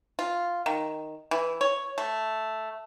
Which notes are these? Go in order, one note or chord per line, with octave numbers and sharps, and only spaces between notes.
F4
D#3
E3
C#5
A3